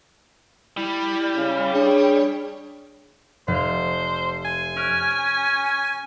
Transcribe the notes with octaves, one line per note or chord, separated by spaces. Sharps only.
G3 E4
C#3
D4 G#4 C#5
F1 C5 F5
G#5
C#4 F6 F#6 D7